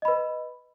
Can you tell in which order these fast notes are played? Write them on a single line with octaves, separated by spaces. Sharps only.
D#5 B5 B4